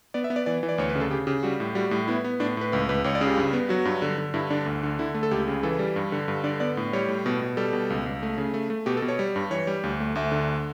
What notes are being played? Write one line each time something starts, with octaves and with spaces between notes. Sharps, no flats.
B3 D5
E5
B3
D5
E3 D5
E3
D5
D2 C#5
B4
C#3 A4
C#3 G4
C#3 G4
G3 F#4
A2
G3 F#4
A2
B3 E4
B3
A2 D4
A2 B4
C#2 B4
C#2 B4
C#2 C#5
D5
C#3
G4
G2
B3
F#3 F#4
G2
D3
D3
G2 E4
D3 D4
D2
D3
D3 E4
A3
A4
C#2 G4
C#3
E3 A4
G3
G2
D3
G2
D3 D5
B3 D5
A2
G3 C#5
A2
B2
B2
G3 A4
B2
C#2
C#2
A3
C#3
A3
A3
B2 G4
A4
B2
C#5
G3
G2
E3 C#5
G3
D2
A3
D2 E5
D3